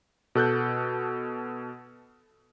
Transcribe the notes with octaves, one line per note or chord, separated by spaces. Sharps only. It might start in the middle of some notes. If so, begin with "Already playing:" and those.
B2 A4 F#6 G6